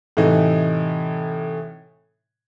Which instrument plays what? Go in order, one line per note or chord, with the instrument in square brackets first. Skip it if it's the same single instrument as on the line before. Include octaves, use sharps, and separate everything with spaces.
[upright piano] A2 C3 E3 D#4